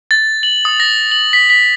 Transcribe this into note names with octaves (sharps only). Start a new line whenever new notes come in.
A6
F#7
D#6
A#6
F#7
B6
B6